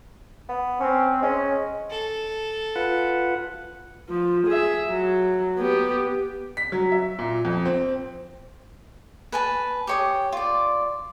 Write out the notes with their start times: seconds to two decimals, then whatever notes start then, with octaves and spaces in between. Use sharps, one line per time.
0.49 B3
0.80 C4 C#4
1.22 G#3 C#4
1.90 A4
2.76 F4 B4 F#5
4.09 F3
4.47 G#4 E5
4.89 F#3
5.57 B3 G4
6.57 B6
6.72 F#3
6.92 E5
7.19 A#2
7.45 F2
7.65 C4
9.32 B4 G#5 A5
9.87 G4 C#5 D#6
10.33 F4 D5